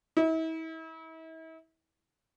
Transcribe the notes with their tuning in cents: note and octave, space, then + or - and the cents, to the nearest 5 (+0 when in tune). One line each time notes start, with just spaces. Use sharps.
E4 -40